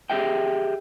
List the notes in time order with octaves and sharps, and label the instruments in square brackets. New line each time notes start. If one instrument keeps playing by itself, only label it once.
[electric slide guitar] G4 G#4 D#5 E5 G5